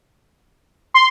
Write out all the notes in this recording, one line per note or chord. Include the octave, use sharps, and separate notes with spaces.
C6